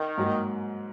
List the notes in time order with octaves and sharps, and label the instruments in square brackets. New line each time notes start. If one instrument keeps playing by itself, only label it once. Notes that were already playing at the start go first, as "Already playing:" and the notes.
Already playing: [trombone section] D#3
[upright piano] G#2 F#3 A#3